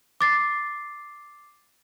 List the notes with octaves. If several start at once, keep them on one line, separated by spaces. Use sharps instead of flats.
D6 A6 C7